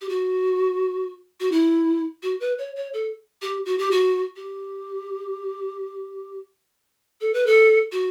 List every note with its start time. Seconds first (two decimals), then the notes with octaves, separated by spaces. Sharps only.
0.01 G4
0.09 F#4
1.40 F#4
1.52 E4
2.23 F#4
2.40 B4
2.58 C#5
2.76 C#5
2.93 A4
3.42 G4
3.66 F#4
3.78 G4
3.91 F#4
4.36 G4
7.21 A4
7.34 B4
7.46 A4
7.92 F#4